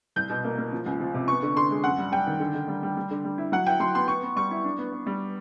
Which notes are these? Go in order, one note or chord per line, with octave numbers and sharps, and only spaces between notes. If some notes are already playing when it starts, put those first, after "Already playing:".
C2 G6
B2
A#3
A#3
F3
C#2
F3
C3
B3 C#6
D3
D3 C6
G#3
F#2 F#5
G3
G3 G5
D#3
D3
D3
G3
G3
G3
D3
G3
E4
F#3 F#5
E4 G5
F#3 C6
B3 C6
B3 C#6
B3
G3 C#6
E4
D4
B3
B3
G3